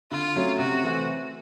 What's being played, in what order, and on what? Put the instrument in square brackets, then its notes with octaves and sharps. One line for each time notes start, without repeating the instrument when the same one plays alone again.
[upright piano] D3 [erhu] F4
[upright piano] F#3 A3 C#4
[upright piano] C3 [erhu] F#4
[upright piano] E3 A3 C4 E4